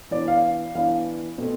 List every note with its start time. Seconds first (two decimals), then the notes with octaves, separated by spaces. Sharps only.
0.11 E3 B3 D4 D5
0.28 F5
0.75 E3 B3 D4 F5
1.38 B2 A3 C4